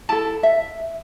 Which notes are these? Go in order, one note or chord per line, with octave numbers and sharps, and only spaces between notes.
E4 A4 A5
E5